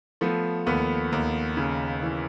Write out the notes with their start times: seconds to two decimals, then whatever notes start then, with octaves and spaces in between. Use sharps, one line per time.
0.21 F3 A3 B3
0.67 D#2 A3 B3
1.12 D#2
1.57 C#3
2.02 E3